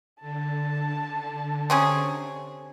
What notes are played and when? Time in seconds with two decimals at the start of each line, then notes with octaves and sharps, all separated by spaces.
0.21 D3 A5
1.70 C3 C#4 G#4